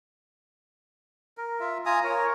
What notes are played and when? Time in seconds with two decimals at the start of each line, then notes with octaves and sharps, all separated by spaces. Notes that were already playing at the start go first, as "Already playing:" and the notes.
1.38 A#4
1.60 F4 E5
1.86 F4 G#5 A#5 D#6
2.04 A#4 C#5